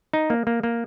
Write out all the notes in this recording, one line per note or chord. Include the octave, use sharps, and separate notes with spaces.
D#4
A#3
A#3
A#3